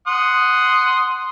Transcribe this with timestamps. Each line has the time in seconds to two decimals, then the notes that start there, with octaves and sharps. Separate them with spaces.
0.07 F#5 C6 D#6